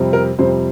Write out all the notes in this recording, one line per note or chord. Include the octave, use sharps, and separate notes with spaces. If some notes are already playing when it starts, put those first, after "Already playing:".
Already playing: F2 C3 G3 C4
A#4
F2 C3 G3 C4 C5